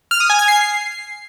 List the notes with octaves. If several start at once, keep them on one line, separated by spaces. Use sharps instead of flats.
F6
D#6
G#5
G#6
C7